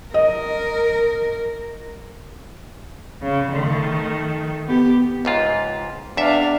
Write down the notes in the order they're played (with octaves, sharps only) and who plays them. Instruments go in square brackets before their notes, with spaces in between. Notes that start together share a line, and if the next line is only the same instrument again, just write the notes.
[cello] A#4 [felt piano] D#5
[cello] C#3
D#3 A3
B3 G4
[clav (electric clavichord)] C#2 G#2 F4
[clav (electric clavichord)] E2 E5 [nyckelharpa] D4 F5